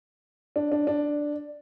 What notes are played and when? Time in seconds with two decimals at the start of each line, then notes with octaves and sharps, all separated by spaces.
0.56 D4
0.72 D4
0.87 D4